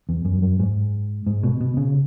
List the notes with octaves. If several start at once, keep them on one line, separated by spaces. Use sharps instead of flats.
E2
F#2
F#2
G#2
G#2
B2
B2
C#3